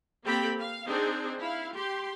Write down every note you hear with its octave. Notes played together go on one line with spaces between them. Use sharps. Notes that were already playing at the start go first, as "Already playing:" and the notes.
A#3 C4 G4 A4 G5 B5
F5
C4 D4 D#4 G#4 C5
E4 F5
G4 C6